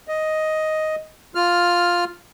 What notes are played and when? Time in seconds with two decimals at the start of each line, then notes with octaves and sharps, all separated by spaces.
0.08 D#5
1.35 F4 F6